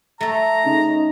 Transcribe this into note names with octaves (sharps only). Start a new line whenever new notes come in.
A3 A4 A#5
C#3 D#4